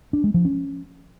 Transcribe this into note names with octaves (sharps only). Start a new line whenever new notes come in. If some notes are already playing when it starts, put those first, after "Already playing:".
D4
G#3
F3
C#4